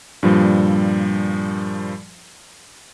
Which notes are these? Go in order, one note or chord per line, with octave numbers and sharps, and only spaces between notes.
G2 A#2 F3 G3